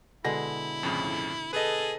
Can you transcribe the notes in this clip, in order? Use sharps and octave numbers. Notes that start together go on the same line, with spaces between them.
B2 D3 G#3 E4 A#6
F2 A2 C#3
G#4 A4 B4 D#5